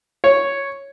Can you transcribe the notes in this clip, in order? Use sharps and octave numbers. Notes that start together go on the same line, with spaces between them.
C#5